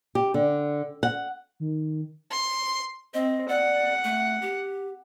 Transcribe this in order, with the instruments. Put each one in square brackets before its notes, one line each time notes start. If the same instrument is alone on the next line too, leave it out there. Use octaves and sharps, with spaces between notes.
[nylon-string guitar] G4
D3
F#5
[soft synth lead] D#3
[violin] C6
[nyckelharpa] C4 [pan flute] D#5
[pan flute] D5 [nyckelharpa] F#5
[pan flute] A3
G4